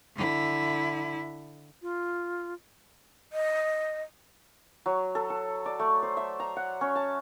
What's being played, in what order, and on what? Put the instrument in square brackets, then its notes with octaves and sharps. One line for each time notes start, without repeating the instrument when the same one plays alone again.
[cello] D3 E4
[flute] F4
[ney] D#5
[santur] F#3
A4
A4
D5
A3
C5
E5
A#5
F#5
C#4
A5